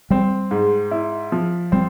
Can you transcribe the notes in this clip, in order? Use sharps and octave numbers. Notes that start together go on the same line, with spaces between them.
G3 C4
G#2
E4
F3
G3 C4